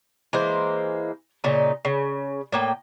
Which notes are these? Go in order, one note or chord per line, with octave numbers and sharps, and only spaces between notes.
E3 G#3 A#3 C5
A#2 C#3 D#4
C#3
A2 A#3 G5